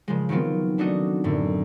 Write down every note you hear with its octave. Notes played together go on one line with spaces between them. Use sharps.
C#3 F3 G#3
D#3 F#3 B3 C4 F4
A3 D4 D#4 F#4 D#5
F#2 A2 D3